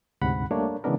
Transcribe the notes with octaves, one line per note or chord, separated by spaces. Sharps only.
D2 G#2 C3 F#5 B5
G3 A3 A#3 D4 C#5
C#3 E3 G#3 B3 D4 A#4